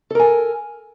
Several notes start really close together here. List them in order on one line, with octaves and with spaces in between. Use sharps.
A4 A#4 G#5